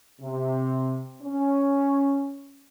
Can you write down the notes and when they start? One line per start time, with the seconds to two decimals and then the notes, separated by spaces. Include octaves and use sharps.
0.21 C3
1.22 C#4